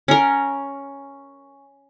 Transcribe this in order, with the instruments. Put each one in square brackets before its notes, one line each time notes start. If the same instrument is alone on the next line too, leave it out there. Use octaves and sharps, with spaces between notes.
[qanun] C#4 A#4